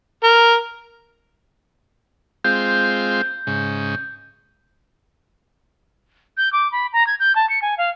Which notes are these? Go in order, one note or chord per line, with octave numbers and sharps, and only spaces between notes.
A#4
G#3 C4 F4 G6
G#2 C#3
G6
D6
B5
A#5
G#6
G6
A5
C#7
G#5
F5